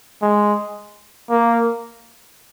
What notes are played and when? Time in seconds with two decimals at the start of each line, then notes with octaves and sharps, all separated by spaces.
0.22 G#3
1.30 A#3